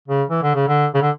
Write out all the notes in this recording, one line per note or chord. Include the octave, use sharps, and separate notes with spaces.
C#3
E3
D3
C#3
D3
C#3
D3